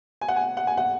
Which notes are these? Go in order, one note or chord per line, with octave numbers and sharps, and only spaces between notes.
G#5
F#5
G#5
F#5
G#5
F#5